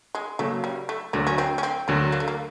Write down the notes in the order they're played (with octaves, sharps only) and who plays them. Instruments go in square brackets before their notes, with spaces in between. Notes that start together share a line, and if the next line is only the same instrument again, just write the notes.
[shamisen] G#3
[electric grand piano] C#3 F#3 A#3 [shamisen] A3
[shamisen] G3
A3
[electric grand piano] D2 D3 F#3 [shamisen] A#3
[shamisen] C#4
C4
C#4
C4
[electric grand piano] D2 D3 F#3 [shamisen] A#3
[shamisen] A#3
A3
A#3